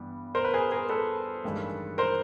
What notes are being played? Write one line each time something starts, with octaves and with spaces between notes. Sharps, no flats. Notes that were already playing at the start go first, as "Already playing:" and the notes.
Already playing: G2 E3 G3 B3
A#4 C5
B4
G#4 A#4
G#4 A#4
A4 B4
A1 G2 D#3 G#3
A#4 C5